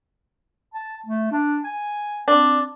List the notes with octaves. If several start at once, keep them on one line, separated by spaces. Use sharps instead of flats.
A5
A3
D4
G#5
C4 D4